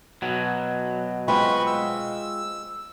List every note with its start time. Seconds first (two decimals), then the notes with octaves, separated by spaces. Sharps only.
0.22 B2 F#3
1.28 G#3 C4 F4 B4 B5 C#6
1.67 E6